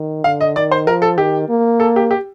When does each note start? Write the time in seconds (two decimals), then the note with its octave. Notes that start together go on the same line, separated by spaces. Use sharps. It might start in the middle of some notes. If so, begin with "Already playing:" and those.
Already playing: D#3
0.24 D3 F5
0.41 D#5
0.56 D#3 D5
0.71 C5
0.87 F3 A#4
1.02 A4
1.18 D#3 G4
1.49 A#3
1.80 A4
1.96 G4
2.11 G4